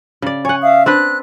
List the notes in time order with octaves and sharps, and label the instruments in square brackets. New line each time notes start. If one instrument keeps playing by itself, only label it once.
[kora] C#3 D5
[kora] C#5 F#5 [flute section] G#5
[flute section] E5 F5 D#6
[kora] C4 D4 B4 [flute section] F#6